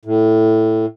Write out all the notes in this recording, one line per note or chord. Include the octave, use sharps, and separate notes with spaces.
A2